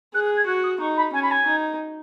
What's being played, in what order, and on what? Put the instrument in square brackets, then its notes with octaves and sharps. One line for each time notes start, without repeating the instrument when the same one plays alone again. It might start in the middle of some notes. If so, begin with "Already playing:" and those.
[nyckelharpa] G#4 [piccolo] F#6
[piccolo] F#6
G#6
[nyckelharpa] F#4 [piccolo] F#6
[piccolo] D#6
[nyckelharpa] D#4 [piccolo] C#6
[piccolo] B5
[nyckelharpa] C#4 [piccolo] G#5
[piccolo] B5
G#5
[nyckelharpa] D#4